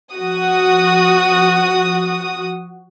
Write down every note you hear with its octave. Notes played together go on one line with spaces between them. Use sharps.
F3 F#4 D#6